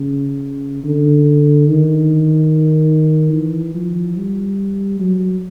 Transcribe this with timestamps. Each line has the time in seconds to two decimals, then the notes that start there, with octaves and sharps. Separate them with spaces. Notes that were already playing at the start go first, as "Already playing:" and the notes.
Already playing: C#3
0.84 D3
1.68 D#3
3.33 E3
3.74 F3
4.17 G3
5.00 F#3